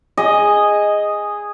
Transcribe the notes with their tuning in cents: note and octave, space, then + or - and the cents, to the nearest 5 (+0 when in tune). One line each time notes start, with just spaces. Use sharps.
G#4 -10 D#5 +0